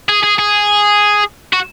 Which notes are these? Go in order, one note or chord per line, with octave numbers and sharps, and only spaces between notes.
G#4
G#4
G#4
F#4